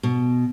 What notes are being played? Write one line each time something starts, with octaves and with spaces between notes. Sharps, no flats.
B2